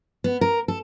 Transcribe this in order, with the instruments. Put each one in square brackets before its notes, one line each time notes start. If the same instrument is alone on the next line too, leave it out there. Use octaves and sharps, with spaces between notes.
[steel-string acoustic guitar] B3
A#4
A4